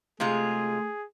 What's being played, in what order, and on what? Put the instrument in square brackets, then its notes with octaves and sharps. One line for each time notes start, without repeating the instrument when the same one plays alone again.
[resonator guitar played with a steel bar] C3 G#3 F4 [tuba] A3 [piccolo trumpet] G#4